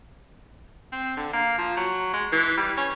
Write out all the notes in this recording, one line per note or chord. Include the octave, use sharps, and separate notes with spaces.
C4
D3
A#3
F3
F#3
G#3
E3
G3
C#4